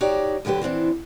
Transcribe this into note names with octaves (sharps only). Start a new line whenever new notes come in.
D#4 F#4 G4 C#5 D5
D2 D3 F#3 G4 B4
E3 B3 C4 D4